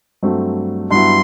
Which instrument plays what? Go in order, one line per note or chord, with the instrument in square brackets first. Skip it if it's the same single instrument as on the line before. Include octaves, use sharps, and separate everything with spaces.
[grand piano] G2 F#3 A3 C4
[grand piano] G2 F#3 B3 E4 [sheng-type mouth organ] C6